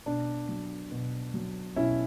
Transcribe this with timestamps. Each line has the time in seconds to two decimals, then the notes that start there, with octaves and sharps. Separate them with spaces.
0.06 B2 D4
0.49 F#3
0.92 B2
1.34 F#3
1.76 B2 C#4 E4